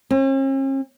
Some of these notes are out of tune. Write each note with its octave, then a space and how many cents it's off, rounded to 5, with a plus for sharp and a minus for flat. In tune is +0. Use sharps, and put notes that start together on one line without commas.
C#4 -45